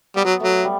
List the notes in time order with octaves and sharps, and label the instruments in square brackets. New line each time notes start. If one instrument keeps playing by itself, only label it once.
[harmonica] G3 [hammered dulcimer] B3
[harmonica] F#3
[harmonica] F#3 [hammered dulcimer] A3
[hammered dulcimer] G3